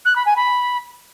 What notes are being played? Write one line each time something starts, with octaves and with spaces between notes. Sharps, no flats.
F#6
B5
G#5
B5